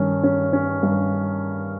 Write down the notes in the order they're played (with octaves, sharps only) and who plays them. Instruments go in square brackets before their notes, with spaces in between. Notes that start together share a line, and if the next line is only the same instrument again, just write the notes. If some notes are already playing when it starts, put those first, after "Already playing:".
Already playing: [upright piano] G2 D#3 C#4
C#4
C#4
G2